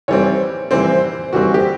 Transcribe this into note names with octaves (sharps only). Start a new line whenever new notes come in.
E3 G3 C4 C#5
E3 G3 C4 C5
E3 G3 C4 F#4
G4